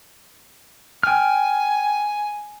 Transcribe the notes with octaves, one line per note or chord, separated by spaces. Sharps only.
G5 G#5 F6